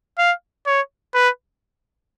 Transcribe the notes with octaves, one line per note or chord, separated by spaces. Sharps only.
F5
C#5
B4